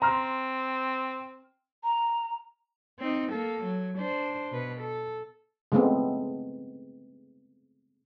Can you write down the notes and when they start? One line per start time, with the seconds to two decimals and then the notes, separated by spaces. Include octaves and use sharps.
0.02 C4 A#5 C6 F6
1.84 A#5
2.99 C4 D#4
3.31 A#3 A4
3.62 F#3
3.98 D4 C5
4.52 B2 B4
4.81 A4
5.72 C#3 G#3 A3 B3 C4